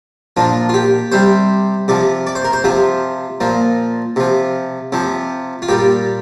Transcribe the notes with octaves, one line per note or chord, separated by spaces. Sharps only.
A#2 F3 D4
F4
G4
C3 G3 C5
C3 F3 D5
D5
C5
A#4
C5
C3 F3 F4
A#2 F3
C3 F3
C3 F3
F4
A#2 G3 G4